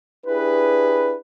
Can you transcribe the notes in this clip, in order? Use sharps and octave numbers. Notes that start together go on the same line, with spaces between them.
D4 E4 G4 G#4 B4